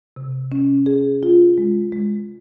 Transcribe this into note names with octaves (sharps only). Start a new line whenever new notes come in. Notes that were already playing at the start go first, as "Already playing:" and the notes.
C3
C#4
G#4
F4
G#3
G#3